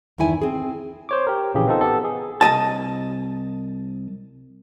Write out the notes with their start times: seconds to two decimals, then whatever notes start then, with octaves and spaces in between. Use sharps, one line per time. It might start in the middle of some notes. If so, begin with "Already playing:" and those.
0.18 E2 G2 D#3 E4 G#5
0.41 C4 G#4
1.09 C5 C#5 D6
1.27 G4 A#4
1.54 A#1 C#3 E3 G4 G#4
1.67 B3 C4 D#4 F4 A4
1.81 B3 G4 A4
2.04 G#4
2.41 C2 G2 D#5 A5